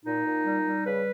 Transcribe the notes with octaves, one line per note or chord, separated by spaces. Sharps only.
A#2 D#4
A#2
G3
G3
C#3 B4